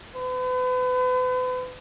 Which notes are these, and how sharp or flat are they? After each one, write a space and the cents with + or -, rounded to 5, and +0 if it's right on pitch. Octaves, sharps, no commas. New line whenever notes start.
B4 +40